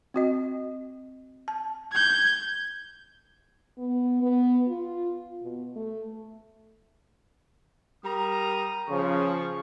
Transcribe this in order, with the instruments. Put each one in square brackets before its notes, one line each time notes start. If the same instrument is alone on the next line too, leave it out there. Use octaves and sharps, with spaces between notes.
[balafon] C4 F#4 D#5
A5
[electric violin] G6 G#6
[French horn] B3
B3
F4
B2
A3
[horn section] G3 A#4 A#5 [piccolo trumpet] D#6
[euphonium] C#3 [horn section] F3 [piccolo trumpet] C#6